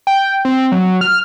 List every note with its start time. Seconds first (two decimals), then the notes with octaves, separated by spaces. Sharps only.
0.07 G5
0.45 C4
0.72 F#3
1.01 F6